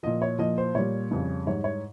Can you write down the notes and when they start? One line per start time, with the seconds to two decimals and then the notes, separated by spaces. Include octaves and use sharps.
0.03 A#2 F3 D#5
0.22 C#5
0.39 A#2 F3 D#5
0.58 C5
0.75 A#2 G3 C#5
1.11 F2 C#3 G3
1.46 G#2 G3 C#5
1.64 C#5